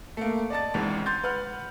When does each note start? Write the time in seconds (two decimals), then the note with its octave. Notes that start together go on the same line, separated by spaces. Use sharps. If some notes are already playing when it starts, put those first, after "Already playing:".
0.17 A3 A#3
0.50 D5 D#5 A5 A6
0.74 G#1 C#2 G#2 E3
1.06 C6 G6 A6
1.24 B4 F#5 F6